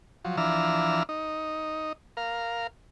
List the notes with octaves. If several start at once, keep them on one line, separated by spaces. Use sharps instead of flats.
F3 F#3
E3 F3 D4 A#5 E6 F6
D#4
A#4 F5